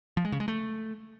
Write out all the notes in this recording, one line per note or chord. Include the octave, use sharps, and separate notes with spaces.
F3
G#3
C#3
G#3
A3